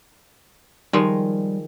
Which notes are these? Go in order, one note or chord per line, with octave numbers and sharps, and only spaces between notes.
D#3 F3 G3 G#3